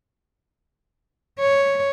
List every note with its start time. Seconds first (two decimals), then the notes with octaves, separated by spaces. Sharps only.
1.40 C#5